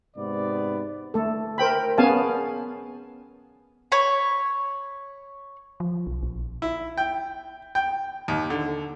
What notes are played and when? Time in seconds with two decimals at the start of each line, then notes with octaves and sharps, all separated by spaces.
0.16 G#2 C3 B3 D5
1.14 A3 A4
1.58 A#4 C5 G5 B5
1.98 B3 C#4 G#4 F5 G#5 A5
3.92 C#5 B5
5.80 F3
6.07 B1
6.23 A#1
6.62 E4
6.98 G5
7.75 G5
8.28 D#2
8.50 D3